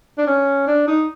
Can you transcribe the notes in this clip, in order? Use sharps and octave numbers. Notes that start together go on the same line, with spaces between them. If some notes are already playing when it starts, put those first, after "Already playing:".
D4
C#4
D4
D#4